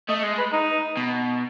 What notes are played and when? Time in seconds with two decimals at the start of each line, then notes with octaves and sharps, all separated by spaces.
0.09 A3 D#5
0.24 G#3
0.38 B4
0.52 D#4
0.97 B2